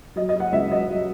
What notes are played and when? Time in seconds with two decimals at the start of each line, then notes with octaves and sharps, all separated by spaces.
0.16 F#3 D#5
0.29 D#5
0.34 F#3
0.40 F#5
0.52 C#2 E5
0.71 F#3 D#5
0.89 F#3